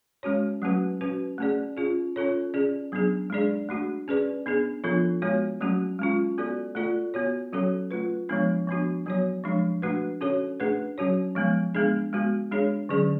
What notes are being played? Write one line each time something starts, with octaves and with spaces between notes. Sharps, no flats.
G#3 C#4 F#4 C#5
F#3 A3 C#4 F#4 B4
C#4 F#4 B4
A3 C#4 G#4 D5
C#4 F4 G#4
C#4 F4 A4 C#5
C#4 G#4 D5
F#3 B3 D4 G#4
G#3 D4 G#4 D5
A3 D4 F#4
C#4 G#4 B4 D5
B3 D4 G#4
F3 B3 D4 F4 A4
G#3 B3 F#4 C#5
F#3 A3 C#4 F#4
G#3 C#4 F4
B3 F#4 A4 D5
A3 F4 A4 D5
B3 F#4 C#5
F#3 C#4 F#4 A4 C#5
A3 F4 B4
F3 G#3 B3 D4
F3 B3 D4 F#4
F#3 B3 F#4 C#5
F3 G#3 D4
A3 D4 F#4 B4
C#4 F#4 A4 C#5
A3 D4 G#4 B4
F#3 C#4 F#4 C#5
F3 G#3 B3
G#3 B3 D4 G#4
G#3 B3 F#4
G#3 D4 G#4 C#5
D3 F#3 C#4 G#4 D5